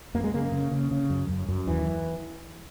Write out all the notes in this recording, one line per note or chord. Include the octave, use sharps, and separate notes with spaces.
F#2 A#3
G#3
C#3 A#3
C#3
C#3
C#3
F#2
F#2
F#2
D#2 E3